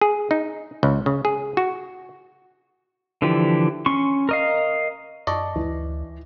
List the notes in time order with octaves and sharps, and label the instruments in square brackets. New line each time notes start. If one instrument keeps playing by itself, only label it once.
[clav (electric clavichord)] G#4
D#4
C#2
C#3
G#4
F#4
[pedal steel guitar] D3 E3 F3 G4
C#4 C6 C#6
A#4 D#5 F5
[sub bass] F#2 [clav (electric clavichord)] D5 D#5 [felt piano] A5 C#6 A#6
[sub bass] D2 [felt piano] E3